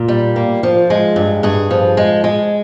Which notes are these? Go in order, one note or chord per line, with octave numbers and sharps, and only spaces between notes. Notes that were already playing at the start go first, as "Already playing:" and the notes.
Already playing: A#2 F4
G3
A#3
F3
G#3
G2
G2 G#4
F3
G#3
G#3